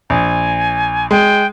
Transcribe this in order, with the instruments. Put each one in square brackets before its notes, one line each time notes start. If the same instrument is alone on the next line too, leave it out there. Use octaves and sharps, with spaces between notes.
[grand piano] A#1 [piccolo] G#5
[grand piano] G#3 [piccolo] G5